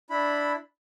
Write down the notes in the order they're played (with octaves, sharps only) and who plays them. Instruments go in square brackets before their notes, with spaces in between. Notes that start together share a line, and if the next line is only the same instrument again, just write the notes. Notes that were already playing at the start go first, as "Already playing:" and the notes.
[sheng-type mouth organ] D4 E4 B5